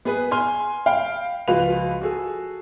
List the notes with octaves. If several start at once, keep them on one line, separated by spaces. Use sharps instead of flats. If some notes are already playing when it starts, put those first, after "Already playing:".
B3 G#4 B4
G#5 C6 F6
F5 G5 B5
C#2 F3 F4 F#4 B4 F7
F#4 G#4 A4